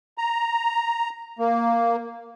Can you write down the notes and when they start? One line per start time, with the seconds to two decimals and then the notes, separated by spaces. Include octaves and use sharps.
0.18 A#5
1.39 A#3